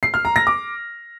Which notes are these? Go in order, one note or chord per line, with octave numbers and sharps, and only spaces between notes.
C7
F6
A#5
A#6
D6